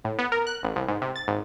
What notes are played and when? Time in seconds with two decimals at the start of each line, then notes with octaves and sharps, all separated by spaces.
0.05 A2
0.19 B3
0.32 A#4
0.47 F#6
0.63 A1
0.76 C2
0.88 G#2
1.02 C3
1.16 A6
1.28 G#1